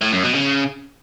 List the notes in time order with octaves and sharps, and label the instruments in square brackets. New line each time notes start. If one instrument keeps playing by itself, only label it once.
[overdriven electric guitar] A2
F#2
B2
C#3